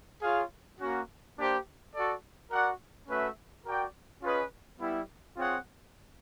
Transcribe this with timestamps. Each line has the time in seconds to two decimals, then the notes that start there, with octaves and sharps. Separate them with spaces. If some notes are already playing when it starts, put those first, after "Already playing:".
0.22 F4 G#4 C#5 F5
0.80 A#3 C#4 F#4
1.37 A#3 D4 G4 C5
1.93 F#4 A4 D5
2.51 F#4 A#4 D5 F#5
3.08 A3 C#4 F#4 B4 E5
3.65 F#4 A#4 D5 G5
4.22 C#4 F4 G#4 B4 D#5
4.80 G3 B3 E4
5.37 C4 F4 G#4 C#5 F#5